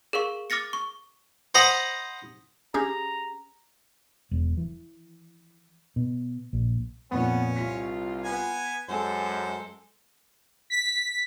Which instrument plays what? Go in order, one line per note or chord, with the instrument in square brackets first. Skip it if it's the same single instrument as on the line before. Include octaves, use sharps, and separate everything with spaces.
[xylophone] G#4 A#4 F5 C#6
D6 F6 A6 A#6 C#7
C#6
[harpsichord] C5 D#5 F#5 A#5 B5
[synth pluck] C#4 G4 G#4 [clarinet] A#5
[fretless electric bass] E1
E3
B2
A#1
[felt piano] F2 A#2 [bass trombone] B3 [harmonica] C#4
[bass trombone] C2 [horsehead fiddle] F4 [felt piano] B6
[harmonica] B3 G#5
[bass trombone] F#2 [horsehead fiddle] G#3 A4 [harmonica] C5
[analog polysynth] B6